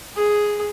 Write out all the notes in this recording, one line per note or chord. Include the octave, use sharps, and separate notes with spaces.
G#4